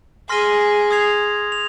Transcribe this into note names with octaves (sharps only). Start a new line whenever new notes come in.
G#4 C6 F6 A#6 D#7 G7
D#6 G#6 C7 F7
F7